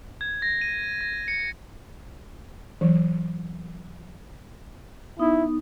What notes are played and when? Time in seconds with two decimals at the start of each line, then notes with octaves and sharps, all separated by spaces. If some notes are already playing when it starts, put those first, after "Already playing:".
0.21 G#6
0.42 A#6
0.61 D#7
1.01 A#6
1.28 C#7
2.81 E3 F#3
5.19 B3 D#4 E4 D#6